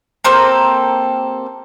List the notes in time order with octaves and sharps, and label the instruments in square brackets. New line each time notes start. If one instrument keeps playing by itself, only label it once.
[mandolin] A#3 C4 G4 A4